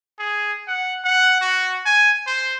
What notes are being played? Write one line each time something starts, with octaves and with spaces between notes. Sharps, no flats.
G#4
F#5
F#5
F#4
G#5
C5